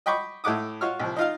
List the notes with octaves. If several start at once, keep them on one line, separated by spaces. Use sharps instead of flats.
D#5 G5 B5 C#6 D6
A2 A3 F#5 D6 D#6
F4 F#4 C#5 F6
C2 F3
D#4 F4 F5